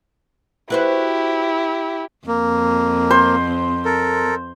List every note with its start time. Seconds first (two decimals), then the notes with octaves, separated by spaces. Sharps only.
0.70 E4 F#4 G4 B4 C5
2.28 F2 A#3
3.11 C5
3.85 A4 A#4